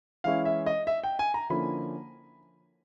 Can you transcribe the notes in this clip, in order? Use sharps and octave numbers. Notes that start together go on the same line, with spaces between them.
E3 G#3 C#4 E4 F5
E5
D#5
E5
G5
G#5
A#5
D3 F3 A#3 C#4 E4 B5